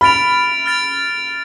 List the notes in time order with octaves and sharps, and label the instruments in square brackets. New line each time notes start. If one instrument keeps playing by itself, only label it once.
[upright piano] B5 [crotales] F6 A6 D7 F7
[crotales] F6 A6 D7 F7